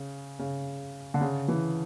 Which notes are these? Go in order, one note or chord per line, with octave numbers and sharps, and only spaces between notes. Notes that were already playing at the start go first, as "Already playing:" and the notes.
Already playing: C#3
C#3
D3
C#3
E3